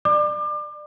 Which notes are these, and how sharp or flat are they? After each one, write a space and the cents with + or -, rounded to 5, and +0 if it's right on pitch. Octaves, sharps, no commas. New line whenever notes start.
D5 +25 D6 +30